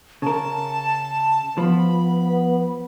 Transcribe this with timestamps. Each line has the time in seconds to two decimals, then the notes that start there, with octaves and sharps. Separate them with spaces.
0.22 C#3 A#4 A5
1.58 F3 B3 B5